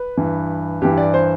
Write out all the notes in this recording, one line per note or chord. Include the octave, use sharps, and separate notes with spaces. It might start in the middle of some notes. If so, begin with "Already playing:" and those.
Already playing: B4
G2 E3
G2 E3 G4
D5
C5